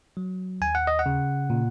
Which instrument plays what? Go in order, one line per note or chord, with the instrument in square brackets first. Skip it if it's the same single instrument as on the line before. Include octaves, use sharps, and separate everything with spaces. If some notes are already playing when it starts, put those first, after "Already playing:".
[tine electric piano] F#3
D#2 G#5
F#5
D#5
F#5
C#3
A#2